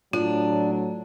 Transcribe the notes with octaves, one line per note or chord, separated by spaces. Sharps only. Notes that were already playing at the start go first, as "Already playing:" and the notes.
A2 F#3 D4 F4